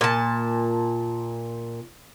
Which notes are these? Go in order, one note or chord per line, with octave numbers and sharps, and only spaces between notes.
A#2 A5